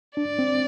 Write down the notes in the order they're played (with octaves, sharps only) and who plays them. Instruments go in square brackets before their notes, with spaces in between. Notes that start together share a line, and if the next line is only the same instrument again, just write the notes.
[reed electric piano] D4 [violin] D5
[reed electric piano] C4